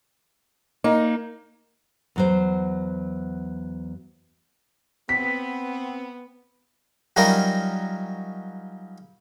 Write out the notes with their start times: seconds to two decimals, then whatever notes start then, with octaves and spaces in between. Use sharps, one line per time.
0.84 A#3 D#4
2.16 E2 F#3 C5
5.09 B3 C4 B6
7.16 F#3 G3 C#4 D#4 F4 A#4